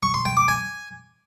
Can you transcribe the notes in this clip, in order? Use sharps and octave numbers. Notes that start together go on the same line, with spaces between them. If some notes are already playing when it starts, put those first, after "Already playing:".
C#6
C6
G5
D6
G#5